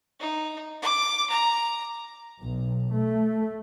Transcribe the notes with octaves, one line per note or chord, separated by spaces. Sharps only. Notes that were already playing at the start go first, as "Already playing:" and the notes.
D#4
D6
A#5
B1
A3